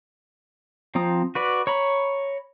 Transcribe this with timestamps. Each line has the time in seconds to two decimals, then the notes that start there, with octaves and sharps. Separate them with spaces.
0.95 F3 C4 A#5 D#6
1.35 F#4 B4 D5
1.67 C#5 A#5 B5